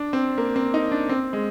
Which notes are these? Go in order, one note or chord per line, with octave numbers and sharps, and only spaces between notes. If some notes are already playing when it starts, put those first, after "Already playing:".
Already playing: D4
C4
A#3
C4
D#4
D4
C4
G#3